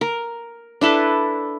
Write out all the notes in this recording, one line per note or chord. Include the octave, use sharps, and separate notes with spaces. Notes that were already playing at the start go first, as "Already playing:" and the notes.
A#4
D4 E4 A4 B4